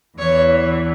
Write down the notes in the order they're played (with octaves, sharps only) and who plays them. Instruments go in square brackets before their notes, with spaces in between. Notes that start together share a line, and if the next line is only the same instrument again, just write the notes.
[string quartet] E2 E3 C#5